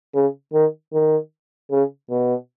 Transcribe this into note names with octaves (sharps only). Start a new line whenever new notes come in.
C#3
D#3
D#3
C#3
B2